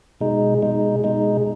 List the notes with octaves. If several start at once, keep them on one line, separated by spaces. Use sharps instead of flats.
B2 G#3 D#4
B2 G#3 D#4
B2 G#3 D#4